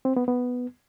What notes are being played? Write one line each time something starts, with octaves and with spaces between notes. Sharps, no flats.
C4
B3
B3